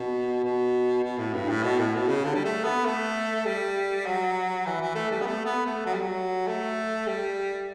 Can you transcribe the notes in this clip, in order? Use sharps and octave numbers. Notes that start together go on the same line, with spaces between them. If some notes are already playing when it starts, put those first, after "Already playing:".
Already playing: B2
B2
B2
A2
G2
A2
B2
A2
B2
C#3
D3
G3
A3
B3
A3
G3
F#3
E3
E3
A3
G3
B3
A3
B3
A3
F#3
G3
F#3
A3
G3